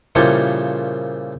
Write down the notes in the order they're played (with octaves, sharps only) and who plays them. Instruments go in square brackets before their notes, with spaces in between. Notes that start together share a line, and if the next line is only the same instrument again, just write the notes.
[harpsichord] A#2 C#3 F3 G3 E4 A4